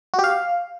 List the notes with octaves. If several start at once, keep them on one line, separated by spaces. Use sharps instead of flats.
F#4
G4
F5